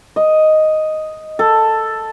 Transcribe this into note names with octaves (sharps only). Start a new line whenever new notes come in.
D#5
A4